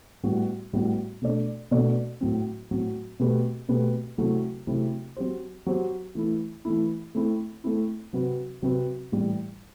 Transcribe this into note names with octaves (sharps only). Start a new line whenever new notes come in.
A2 G3 B3 F#4
A2 G3 B3 F#4
B2 A3 D4 A4 D5
B2 A3 D4 A4 D5
A2 F#3 C4
A2 F#3 C4
B2 A3 C4 G4 B4
B2 A3 C4 G4 B4
C3 F#3 A3 E4
C3 F#3 A3 E4
F#3 C4 G4 C5
F#3 C4 G4 C5
E3 A3 E4
E3 A3 E4
A3 C4 E4
A3 C4 E4
C3 F#3 C4 F#4 B4
C3 F#3 C4 F#4 B4
A2 E3 G3